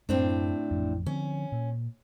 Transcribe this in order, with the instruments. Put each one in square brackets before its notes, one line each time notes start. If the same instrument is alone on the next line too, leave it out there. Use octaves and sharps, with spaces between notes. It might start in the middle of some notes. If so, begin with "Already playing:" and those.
[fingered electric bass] F#2 [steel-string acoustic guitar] A2 C4 D4
[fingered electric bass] A1 F2
[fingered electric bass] D3 F3 C4 [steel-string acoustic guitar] C#4
[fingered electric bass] A#2